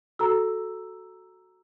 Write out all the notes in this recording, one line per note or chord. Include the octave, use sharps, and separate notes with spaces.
F#4 A4 A#5 E6